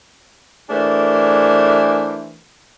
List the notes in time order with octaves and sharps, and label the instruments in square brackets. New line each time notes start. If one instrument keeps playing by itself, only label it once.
[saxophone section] E3 A3 D4 G#4 A#4 C5